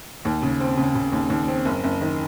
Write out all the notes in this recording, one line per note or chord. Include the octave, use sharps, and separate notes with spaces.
D#2
C#3
C4
C#3
C#3
D#2
D#2
C4
F#1
F#1
D#3